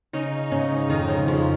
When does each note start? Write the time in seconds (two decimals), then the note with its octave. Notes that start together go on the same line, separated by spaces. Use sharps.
0.13 C#3 C#4 D#4
0.51 G#2 C#3 C#4
0.90 F2 D#3 D#4
1.09 C#3 C#4
1.28 F2 F3